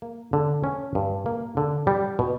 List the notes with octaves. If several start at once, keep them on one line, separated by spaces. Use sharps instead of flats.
A#3
D3
C#4
G2
A#3
D3
G3
B2